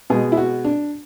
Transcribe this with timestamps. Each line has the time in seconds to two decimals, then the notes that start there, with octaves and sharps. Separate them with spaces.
0.10 B2 G#3 G#4
0.32 E4
0.37 F#4
0.65 D4